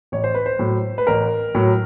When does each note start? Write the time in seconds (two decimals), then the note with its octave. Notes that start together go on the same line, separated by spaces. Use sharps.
0.12 A1 C#5
0.24 C5
0.34 B4
0.46 C5
0.59 A2 F#3
0.98 B4
1.07 A1 A#4
1.55 A2 F#3